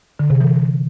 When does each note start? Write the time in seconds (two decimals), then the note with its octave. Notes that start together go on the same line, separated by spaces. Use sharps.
0.19 D3
0.30 C3
0.40 E3